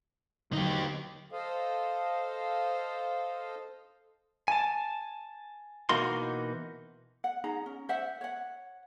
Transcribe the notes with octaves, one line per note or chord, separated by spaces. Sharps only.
D3 F#3 D#4 G4
A4 C5 D#5 F5
G#5 A5
B2 E3 A#3 D#4 F#4 C6
F#5
D#4 G#4 A#5
C#4
C5 E5 F#5
C#5 F#5